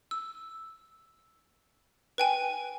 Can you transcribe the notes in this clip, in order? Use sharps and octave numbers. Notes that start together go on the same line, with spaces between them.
E6
B4 G5 G#5